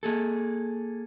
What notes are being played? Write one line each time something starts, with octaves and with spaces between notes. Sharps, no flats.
A#3 G#4 A4